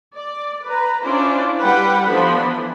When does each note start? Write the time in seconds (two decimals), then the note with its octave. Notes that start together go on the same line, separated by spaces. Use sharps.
0.16 D5
0.67 B4 A#5
1.03 C#4 D4 E4 F4 C5 D5
1.62 G3 G4 B4 F#5 G5
2.07 F3 B3 D4 A4 B5
2.40 E3